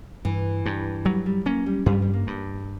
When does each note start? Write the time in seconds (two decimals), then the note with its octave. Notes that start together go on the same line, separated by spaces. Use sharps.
0.25 G2 E3
0.66 G2
1.05 F#3 G3
1.26 G3
1.46 A#3 C#4
1.66 G3
1.86 G2 G3
2.02 G3
2.14 A#3
2.27 G2